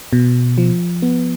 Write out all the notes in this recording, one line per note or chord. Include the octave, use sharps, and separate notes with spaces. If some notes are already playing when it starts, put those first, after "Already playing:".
B2
F3
B3